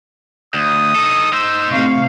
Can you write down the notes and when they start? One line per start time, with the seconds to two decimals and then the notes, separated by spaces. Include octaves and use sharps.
0.54 D2 D#6
0.95 D#4 A4
1.33 D#4 C5 E6
1.71 A2 C3 F5 C#6